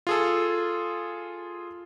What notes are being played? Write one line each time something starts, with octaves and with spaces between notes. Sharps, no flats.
F4 G#4 A4